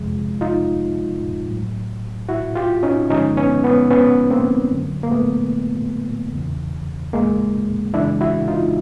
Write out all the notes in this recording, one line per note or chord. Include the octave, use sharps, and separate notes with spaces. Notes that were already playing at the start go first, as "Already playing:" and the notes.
Already playing: F2 C3 F3 G#3
D#4 F4
A2 F#3
E4 F#4
F4 G4
C#4 D#4
G2 D3 F3 G#3 C#4 D#4
B3 C#4
B3 C#4
B3 C#4
A#3 C4
F#2 D3 F#3
A#3
A3 B3
E2 C#3 E3
G#3 A#3
F#2 C#3 E3 G#3 D4 E4
E4 F#4
D#4 F4